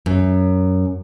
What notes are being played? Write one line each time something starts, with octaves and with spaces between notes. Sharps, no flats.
F#2